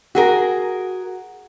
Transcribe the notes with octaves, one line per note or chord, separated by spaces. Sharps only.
F#4 G#4 A#4